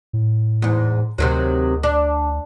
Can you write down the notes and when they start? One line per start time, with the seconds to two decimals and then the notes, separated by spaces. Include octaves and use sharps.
0.13 A2
0.62 E2 G#2
1.18 D2 C3 D#3 F#3
1.83 D4